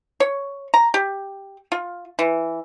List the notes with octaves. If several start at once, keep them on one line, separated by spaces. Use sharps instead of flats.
C#5
A#5
G4
F4
E3